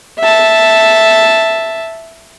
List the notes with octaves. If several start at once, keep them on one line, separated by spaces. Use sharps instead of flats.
E5 A5